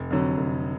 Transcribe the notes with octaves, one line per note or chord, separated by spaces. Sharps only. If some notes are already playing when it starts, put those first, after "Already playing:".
Already playing: F1
F2 D3 F#3
F1